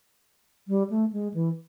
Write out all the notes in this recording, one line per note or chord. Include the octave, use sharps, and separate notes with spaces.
G3
A3
G#3
E3